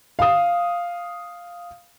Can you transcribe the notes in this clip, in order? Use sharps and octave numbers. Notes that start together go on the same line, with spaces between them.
F5 D#6